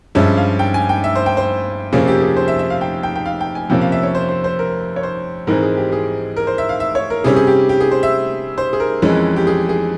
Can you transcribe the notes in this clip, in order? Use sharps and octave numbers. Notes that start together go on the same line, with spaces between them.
G2 F3 G#3 C#4 E5
F5
G5
G#5
G5
E5
C5
G5
C5
F2 C3 F3 A#3 C#4 G#4
G4
G#4
C5
E5
E5
F5
G5
G5
G5
F5
G5
G#5
F2 C3 F3 A#3 C#4 G5
F5
E5
C#5
C5
C5
C5
A#4
C#5
C5
G#2 E3 G#3 C4 A#4
G#4
G4
G#4
A#4
C5
E5
F5
E5
C#5
A#4
C3 G3 C#4 G#4
G#4
G4
G4
G#4
C5
E5
C5
G#4
A#4
F2 E3 G#3 C#4
G4
G#4
G#4